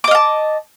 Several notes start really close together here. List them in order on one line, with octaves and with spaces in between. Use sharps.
D6 D#5 F5 A5